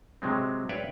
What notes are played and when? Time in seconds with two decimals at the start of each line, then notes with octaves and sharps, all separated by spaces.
0.22 C3 F#3 G#3 C4
0.69 B4 C#5 D5 E5 F5 G5